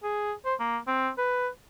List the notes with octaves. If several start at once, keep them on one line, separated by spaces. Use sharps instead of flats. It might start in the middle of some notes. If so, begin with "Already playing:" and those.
G#4
C5
A#3
C4
B4